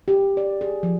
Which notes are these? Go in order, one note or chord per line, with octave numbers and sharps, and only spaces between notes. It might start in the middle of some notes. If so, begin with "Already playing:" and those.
G4
D5
G#4
F3